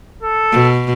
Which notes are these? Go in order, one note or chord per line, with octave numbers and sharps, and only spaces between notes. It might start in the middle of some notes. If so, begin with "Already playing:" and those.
A4
B2